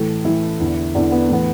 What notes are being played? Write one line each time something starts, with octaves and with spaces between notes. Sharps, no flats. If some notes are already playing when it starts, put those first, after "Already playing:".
Already playing: A2 E3 A4
A2 E3 E4
E2 D3
E2 D3 D4
B3
A2 E3 B3